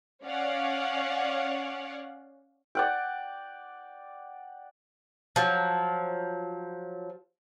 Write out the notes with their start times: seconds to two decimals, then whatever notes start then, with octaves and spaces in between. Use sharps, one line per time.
0.25 C#4 C#5 D5 F5 F#5
2.75 D5 F#5 G5
5.36 F3 F#3